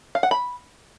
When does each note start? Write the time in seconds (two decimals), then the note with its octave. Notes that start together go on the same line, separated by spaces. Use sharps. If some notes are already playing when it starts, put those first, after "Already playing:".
0.15 F5
0.23 F#5
0.31 B5